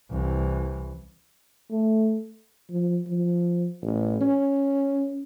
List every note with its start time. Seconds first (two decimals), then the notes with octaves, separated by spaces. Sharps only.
0.11 C2 E3
1.71 A3
2.70 F3
3.08 F3
3.82 A1
4.21 C#4